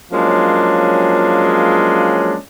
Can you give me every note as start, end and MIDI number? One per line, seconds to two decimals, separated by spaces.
0.12 2.36 53
0.12 2.36 54
0.12 2.36 56
0.12 2.36 58
0.12 2.36 61
0.12 2.36 62